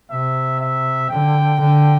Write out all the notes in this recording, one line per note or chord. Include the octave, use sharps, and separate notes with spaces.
C3 E5
E5
D3 G5
D3